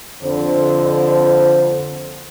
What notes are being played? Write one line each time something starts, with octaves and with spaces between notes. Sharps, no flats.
F2 D3 C5